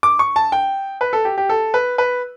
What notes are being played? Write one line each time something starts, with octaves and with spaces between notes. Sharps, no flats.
D6
C#6
A5
G5
B4
A4
G4
G4
A4
B4
B4